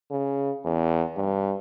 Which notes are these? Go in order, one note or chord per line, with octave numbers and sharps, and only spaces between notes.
C#3
E2
G2